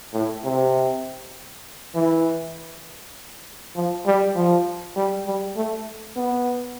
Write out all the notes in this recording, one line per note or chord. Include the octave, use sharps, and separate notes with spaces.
A2
C3
E3
F3
G3
F3
G3
G3
A3
B3